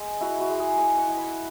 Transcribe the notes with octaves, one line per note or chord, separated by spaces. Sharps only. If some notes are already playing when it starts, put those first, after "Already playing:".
Already playing: G#3
E4 F#4
F#4
G#3
G#4
G#3 C#5
F#5
E4
B5